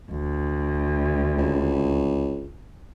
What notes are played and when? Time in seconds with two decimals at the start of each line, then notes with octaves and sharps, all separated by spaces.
0.11 D2
1.38 C#2